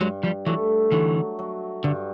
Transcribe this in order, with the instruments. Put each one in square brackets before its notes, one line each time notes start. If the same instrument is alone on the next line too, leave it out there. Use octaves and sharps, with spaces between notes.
[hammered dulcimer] G2 [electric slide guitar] F#3 G#3
[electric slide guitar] F3 G3
[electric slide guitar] E3 F#3 [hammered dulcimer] A3
[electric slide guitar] D3 E3 [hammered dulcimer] F#3
[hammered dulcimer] F#3
[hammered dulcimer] G2 [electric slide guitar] D3